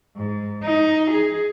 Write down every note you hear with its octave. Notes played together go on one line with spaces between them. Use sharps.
G#2
D#4
G#4